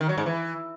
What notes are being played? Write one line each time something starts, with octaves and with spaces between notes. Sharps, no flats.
D#3
F#3
G#2
E3